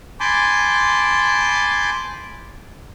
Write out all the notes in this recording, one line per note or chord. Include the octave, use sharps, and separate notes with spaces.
G#5 A5 B5 C6 D6 G6